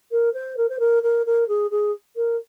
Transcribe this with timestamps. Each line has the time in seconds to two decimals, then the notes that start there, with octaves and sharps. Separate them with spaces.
0.11 A#4
0.34 C5
0.57 A#4
0.69 C5
0.79 A#4
1.03 A#4
1.26 A#4
1.48 G#4
1.71 G#4
2.16 A#4